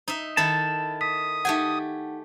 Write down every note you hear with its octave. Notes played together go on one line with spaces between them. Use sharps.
D#4 E5
D#3 E4 A4 A5
D#6 B6
A3 D#4 G4 F#5 G#5